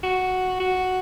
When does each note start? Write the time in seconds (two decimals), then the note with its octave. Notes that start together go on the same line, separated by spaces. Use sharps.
0.03 F#4
0.60 F#4